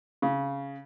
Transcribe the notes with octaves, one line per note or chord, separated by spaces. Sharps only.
C#3